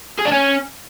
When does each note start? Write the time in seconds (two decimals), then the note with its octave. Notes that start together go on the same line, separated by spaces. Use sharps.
0.19 G#4
0.25 D4
0.32 C#4